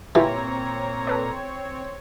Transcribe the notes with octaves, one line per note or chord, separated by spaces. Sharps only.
A#2 E3 C4 E4 F4 G4 C#5 A#5
A4 B4 D5